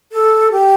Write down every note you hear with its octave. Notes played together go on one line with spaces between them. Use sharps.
A4
G4